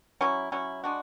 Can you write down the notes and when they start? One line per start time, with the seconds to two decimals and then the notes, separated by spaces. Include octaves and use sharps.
0.21 F#3 C#4 E4
0.52 F#3 C#4 E4
0.84 G#3 D4 F#4